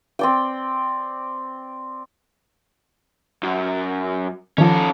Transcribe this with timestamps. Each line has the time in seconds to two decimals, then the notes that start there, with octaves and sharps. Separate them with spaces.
0.19 C4 D5 G5
3.43 F#2
4.58 D#3 F3 C#4 A4